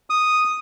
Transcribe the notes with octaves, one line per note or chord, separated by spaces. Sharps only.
D#6